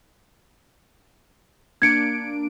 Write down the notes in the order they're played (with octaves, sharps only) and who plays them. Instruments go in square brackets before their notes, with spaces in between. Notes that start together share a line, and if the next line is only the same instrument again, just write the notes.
[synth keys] A#3 D4 D7 [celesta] G#6 C#7